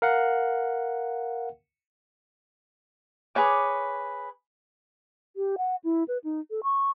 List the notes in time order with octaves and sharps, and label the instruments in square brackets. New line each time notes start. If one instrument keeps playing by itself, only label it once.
[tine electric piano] A#4 F5 F#5
[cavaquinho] G#4 B4 C#5 D6
[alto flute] G4
F#5
E4
B4
D#4
A4
C#6